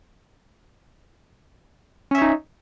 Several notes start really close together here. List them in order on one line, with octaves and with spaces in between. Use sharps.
C#4 E5 C#5 D#4